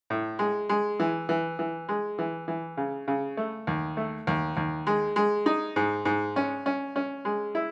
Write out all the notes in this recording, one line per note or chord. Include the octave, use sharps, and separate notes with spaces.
A2
G#3
G#3
E3
E3
E3
G#3
E3
E3
C#3
C#3
A3
D#2
A3
D#2
D#2
G#3
G#3
D#4
G#2
G#2
C#4
C#4
C#4
G#3
E4